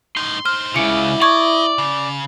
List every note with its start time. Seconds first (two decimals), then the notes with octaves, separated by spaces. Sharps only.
0.17 A2 D#4 C6
0.46 D#4 C5 F6
0.76 C#2 C#3 E4 F#4 D5 C#7
1.22 D5 D#5 C#6 G#6
1.78 C#3